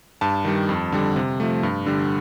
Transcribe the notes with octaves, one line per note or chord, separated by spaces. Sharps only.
G2 A5
D#3 G3
F2
D3 G3
C3
F3 A3
G2
D3 G3